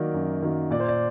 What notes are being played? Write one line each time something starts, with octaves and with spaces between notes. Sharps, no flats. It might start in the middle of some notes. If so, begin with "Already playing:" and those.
Already playing: D#3 F#3 A#3 D5
F#2
D#3 F#3 A#3
A#2 D5
C5
D5